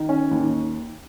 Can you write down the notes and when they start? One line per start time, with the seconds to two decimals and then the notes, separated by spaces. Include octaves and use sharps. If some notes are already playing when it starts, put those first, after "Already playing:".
Already playing: D#3
0.09 C#4
0.31 D#2